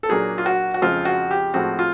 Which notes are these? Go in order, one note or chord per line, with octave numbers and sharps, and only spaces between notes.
A4
A#2 F#3 A#3 D4 G#4
F4
F#4
F#4
F2 C#3 F3 G#3 C4 F4
F#4
G4
A2 F3 G#3 C4 F#4
F4